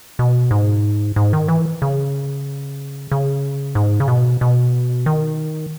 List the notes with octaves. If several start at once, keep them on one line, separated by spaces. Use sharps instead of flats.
B2
G#2
G#2
D#3
E3
C#3
C#3
G#2
C#3
B2
B2
D#3